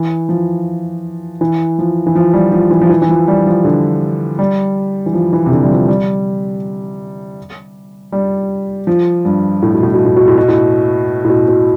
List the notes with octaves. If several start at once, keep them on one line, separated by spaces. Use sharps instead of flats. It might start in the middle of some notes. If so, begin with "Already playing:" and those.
Already playing: E3
F3
E3
F3
E3
F3
G3
F3
E3
F3
E3
E3
F3
G3
F3
D3
G3
E3
F3
E3
C3
D3
G3
F3
G3
G3
F3
G2
A2
B2
A2
B2
A2
B2
A2
B2
A2
A2
B2
B2